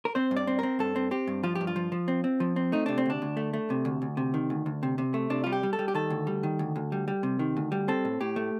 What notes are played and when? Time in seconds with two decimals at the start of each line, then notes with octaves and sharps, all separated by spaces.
0.05 A#4
0.15 C4 C5
0.31 G2
0.37 D5
0.47 C4
0.59 C4 A#4
0.79 G2 A4
0.96 C4
1.11 C4 G4
1.27 G2
1.43 F3 F4
1.55 G4
1.61 G2
1.67 F4
1.76 F3
1.92 F3
2.08 C4
2.24 C4
2.40 F3
2.56 C4
2.72 A3 D#4
2.86 C3 D4
2.98 C4
3.06 D2 D4
3.22 D2
3.37 A3
3.53 A3
3.70 C3
3.85 D2
4.02 D2
4.17 C3
4.34 D#3
4.50 D2
4.66 D2
4.83 C3
4.98 C3
5.14 A3
5.30 C3 D4
5.44 F4
5.46 G3
5.53 G4
5.63 G3
5.73 A4
5.79 G3
5.88 G4
5.94 D#3 A4
6.10 D2
6.27 G3
6.43 D#3
6.59 D2
6.76 D2
6.92 G3
7.08 G3
7.23 C3
7.39 D#3
7.57 D2
7.72 G3
7.88 C4 A4
8.05 A2
8.20 A2 G4
8.36 A3